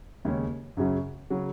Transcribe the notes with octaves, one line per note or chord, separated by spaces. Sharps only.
D#2 C#3 G#3 C#4
F#2 C#3 F#3 C#4
C#3 F#3 C#4